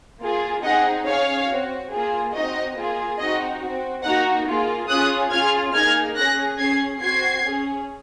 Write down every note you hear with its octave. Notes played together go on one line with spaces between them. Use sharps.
A#3 F4 G#4
C4 D#4 G#4 D#5 F#5
C#4 G#4 C#5 F5
C4 F#4
A#3 F4 G#4
C4 D#4 F#4 D#5
A#3 F4 G#4
C4 D#4 F#4 D#5
C4 F#4
A#3 D#4 F#4 F#5 A#5
A#3 F4 G#4
C#4 F4 G#4 D#6 F#6
C#4 F4 G#4 F6 G#6
A#3 D#4 G#4 F6 G#6
C#4 G#4 F#6 A#6
C#4 G#4 G#6 C7
C4 F#4 G#6 C7
C#4 G#4